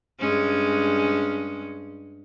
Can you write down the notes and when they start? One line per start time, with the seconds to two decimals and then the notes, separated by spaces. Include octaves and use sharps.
0.19 G2 G#3 C#4